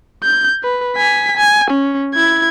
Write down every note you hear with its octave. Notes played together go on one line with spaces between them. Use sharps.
G6
B4
G#5 B6
G#5
C#4
E4 G#6